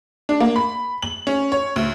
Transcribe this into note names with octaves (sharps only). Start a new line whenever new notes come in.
D4
A#3
B5
F#7
C#4
C#5
D2